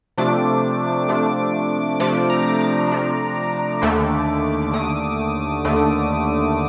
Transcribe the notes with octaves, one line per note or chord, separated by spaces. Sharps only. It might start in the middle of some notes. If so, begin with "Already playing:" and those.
C3 F3 A3 D4 D6
C3 F3 A3 D4
C3 F3 A3 D4 D6
A#5
D6
C3 F3 A3 D4
D#2 D3 A3
D#2 D3 A3 D#6
D#2 D3 A3